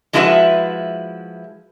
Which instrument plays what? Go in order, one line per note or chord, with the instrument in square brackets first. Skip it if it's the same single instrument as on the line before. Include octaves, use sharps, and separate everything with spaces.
[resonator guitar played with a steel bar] F3 G#3 E4 F#4 B4 E5